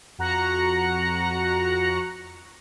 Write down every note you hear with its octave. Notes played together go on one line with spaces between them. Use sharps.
F2 F#4 A#5 F#6 A#6 C#7